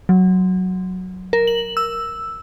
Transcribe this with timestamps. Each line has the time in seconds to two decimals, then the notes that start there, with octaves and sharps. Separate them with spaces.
0.09 F#3
1.33 A#4
1.47 F#7
1.77 E6